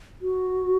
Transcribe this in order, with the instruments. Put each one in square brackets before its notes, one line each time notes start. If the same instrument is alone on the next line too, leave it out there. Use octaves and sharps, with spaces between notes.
[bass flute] F#4